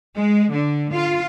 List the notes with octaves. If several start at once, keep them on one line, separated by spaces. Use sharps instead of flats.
G#3
D3
F4